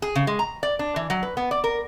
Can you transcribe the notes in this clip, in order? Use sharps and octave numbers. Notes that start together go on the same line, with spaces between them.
G#4
C#3
G#3
A#5
D5
D4
E3
F#3
B4
B3
D5
A#4